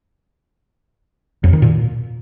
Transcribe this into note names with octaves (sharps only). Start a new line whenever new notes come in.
F2
D#3
A#2